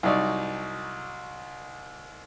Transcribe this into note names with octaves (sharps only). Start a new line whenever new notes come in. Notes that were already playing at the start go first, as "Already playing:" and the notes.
C2 F#3 G3 D#4 D5 E5